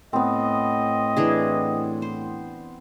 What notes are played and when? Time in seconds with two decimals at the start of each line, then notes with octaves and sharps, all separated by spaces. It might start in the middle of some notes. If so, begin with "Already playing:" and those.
0.13 A2 B3 C4 D#5
1.17 E3 D4 G#4
2.02 C5